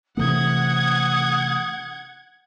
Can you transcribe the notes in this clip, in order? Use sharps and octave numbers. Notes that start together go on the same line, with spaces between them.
C3 E3 A3 F#5 D#6 G#6